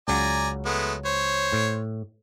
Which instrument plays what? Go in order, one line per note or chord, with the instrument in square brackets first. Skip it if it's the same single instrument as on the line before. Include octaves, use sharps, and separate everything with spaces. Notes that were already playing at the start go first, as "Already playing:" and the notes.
[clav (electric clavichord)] C#2 C#3 F#3 [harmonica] D5 G#5 A#5
[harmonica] G#3 A3 B3
C5 C#5
[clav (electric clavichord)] A2